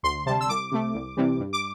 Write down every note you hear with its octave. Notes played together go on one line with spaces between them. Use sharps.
D2 C6
C3 G3 A5
E6
C2 D6
C3 A3
C2
C3 E3 G3
G2
D6